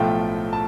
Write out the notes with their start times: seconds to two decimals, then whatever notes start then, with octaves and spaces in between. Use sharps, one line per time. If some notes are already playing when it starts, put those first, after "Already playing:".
Already playing: B1 A2 F3 A3 G5
0.53 A5